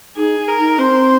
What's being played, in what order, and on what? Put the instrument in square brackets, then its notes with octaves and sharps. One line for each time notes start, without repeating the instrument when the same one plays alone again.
[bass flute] D#4 [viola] G#4
[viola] A#4
[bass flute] D#4
[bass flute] C4 [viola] C5